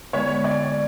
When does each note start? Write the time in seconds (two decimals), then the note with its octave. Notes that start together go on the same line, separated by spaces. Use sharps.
0.13 D3 G#3 B3 C#5
0.44 D5